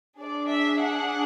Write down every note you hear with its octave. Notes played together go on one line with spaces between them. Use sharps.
D4 G#4 D5
E5
F#5